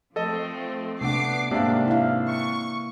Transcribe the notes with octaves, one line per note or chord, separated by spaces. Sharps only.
F3 A3 C4 A4 D#5
C3 A3 B3 D4 F#5 D6 C7
G#2 C3 A#3 D4 E5 F5
E4 F5
C#6